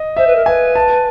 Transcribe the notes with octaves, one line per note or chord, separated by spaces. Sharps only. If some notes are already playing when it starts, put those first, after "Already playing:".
Already playing: D#5
C5 E5
B4
A#4
B4 G#5
A5